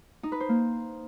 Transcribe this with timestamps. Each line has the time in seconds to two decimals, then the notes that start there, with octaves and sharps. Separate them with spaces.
0.23 D#4
0.32 B4
0.40 C5
0.49 A#3